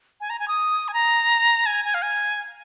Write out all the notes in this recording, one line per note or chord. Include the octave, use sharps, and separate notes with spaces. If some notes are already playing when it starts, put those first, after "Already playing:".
G#5
A#5
G#5
D#6
G#5
A#5
G#5
G#5
F5
G#5